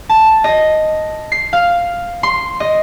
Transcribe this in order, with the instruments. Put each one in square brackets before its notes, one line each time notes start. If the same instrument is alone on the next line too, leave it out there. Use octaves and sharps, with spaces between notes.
[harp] A5
D#5
C7
F5
C6
D#5